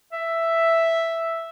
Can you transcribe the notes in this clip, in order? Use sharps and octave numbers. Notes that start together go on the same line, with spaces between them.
E5